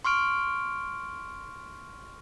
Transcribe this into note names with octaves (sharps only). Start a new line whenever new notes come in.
C6 C#6 F6 D7